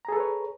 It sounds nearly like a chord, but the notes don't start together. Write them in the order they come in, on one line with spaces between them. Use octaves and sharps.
A#5 G#4 A4 B4 C#5